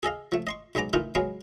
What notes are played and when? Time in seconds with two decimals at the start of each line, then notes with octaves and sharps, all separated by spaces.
0.03 G#4 A4 D#5 F5
0.32 F3 A3
0.47 D#5 C6 C#6
0.75 B1 G#3 B3 A#5 D6
0.93 E3 A3 D#4 F4 A#4
1.15 F#3 G#3 B3 G#4 F5